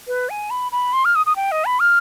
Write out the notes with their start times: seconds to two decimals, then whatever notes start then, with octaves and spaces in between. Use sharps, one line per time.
0.08 B4
0.30 G#5
0.50 B5
0.72 B5
0.93 C6
1.05 F6
1.15 D#6
1.26 D#6
1.36 G5
1.52 D#5
1.65 B5
1.80 F6